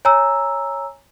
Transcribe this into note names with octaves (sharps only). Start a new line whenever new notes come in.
C#5 G#5 A#5 E6